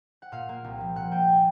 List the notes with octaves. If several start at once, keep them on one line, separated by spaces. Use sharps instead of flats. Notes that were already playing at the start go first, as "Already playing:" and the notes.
F#5
A#2 F5
A#3
C2
F3
A#2 F#5
A#3 G5
G#5